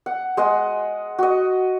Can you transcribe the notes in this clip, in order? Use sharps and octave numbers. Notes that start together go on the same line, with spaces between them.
F#5
G#3 D#5 F#5
F#4 D#5